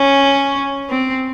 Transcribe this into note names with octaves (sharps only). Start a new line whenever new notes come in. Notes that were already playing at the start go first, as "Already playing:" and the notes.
Already playing: C#4
C4